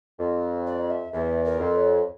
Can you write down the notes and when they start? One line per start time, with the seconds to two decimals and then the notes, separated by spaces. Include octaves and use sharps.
0.19 F2
0.66 D5
0.90 E5
1.13 E2 E5
1.44 A#4
1.60 F2
1.75 C#5